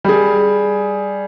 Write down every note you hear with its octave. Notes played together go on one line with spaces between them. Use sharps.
G3 G#4